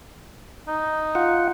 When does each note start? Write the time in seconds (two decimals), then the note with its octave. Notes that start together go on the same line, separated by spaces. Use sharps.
0.68 D#4
1.15 F4 F#5